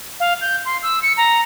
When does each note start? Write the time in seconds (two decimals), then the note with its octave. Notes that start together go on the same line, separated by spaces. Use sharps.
0.20 F5
0.41 G6
0.65 C6
0.83 E6
1.02 C#7
1.17 A#5